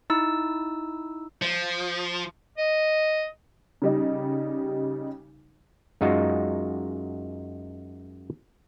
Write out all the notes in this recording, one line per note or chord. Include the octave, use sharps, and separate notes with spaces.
D#4 E4 E6
F3
D#5
C#3 G3 D#4
F#2 G#3 D#4 F4 F#4